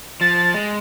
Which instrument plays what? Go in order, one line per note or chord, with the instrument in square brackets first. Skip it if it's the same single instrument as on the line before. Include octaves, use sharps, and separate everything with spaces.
[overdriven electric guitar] F3 [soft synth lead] A6
[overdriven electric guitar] G#3